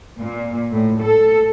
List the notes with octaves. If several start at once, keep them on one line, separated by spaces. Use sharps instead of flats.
A#2
A2
A4